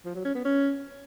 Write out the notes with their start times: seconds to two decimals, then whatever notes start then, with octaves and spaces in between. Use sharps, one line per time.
0.05 F3
0.15 F#3
0.25 C#4
0.35 B3
0.44 C#4